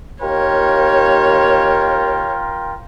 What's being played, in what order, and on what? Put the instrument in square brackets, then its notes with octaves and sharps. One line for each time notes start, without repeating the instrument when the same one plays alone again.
[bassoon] D#2 [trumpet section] F4 A#4 G5 [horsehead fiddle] C#5